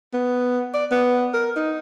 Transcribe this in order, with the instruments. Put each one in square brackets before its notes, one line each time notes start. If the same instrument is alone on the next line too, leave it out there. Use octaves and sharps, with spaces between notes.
[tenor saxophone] B3
D5
B3
A#4
D#4